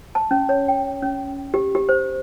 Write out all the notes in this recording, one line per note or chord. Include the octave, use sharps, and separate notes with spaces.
A5
C#4
C#5
G5
C#4
G4
G4
C5